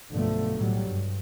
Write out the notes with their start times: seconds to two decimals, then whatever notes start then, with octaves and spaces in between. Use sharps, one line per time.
0.12 B1 G2 D3 F3 A3
0.56 A2 F#3 G3
0.87 G2